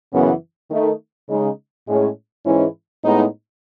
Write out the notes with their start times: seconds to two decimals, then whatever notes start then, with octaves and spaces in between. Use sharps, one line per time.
0.12 F#2 C#3 E3 B3
0.70 D#3 A3 D#4
1.29 C#3 G#3 D#4
1.88 A2 G#3 C#4
2.45 G#2 E3 G#3 C#4 E4
3.04 A2 G#3 B3 D#4